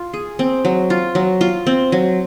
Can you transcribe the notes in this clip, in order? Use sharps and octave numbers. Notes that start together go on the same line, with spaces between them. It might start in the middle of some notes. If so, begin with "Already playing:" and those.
Already playing: F4
G#4
C4
F#3
F4
F#3
F4
C4
F#3